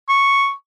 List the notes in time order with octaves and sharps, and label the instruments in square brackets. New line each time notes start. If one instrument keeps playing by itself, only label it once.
[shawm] C#6